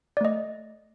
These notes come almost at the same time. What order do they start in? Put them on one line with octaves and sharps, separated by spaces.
D5 A3 D#5